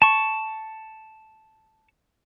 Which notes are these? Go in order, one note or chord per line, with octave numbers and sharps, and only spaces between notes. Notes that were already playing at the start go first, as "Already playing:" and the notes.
A5 C#6